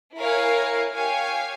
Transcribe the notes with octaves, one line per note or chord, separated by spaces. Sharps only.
E4 A#4 C#5 F5 G#5
G4 C#5 F5 G#5